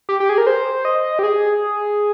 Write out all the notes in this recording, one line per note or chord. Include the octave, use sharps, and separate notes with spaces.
G4
G4
G#4
A#4
C5
D#5
G4
G#4